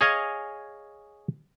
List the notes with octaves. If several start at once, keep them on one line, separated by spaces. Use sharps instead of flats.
G#4 C#5 D#5 F5 G#5